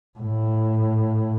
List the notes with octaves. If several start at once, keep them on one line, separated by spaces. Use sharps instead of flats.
A2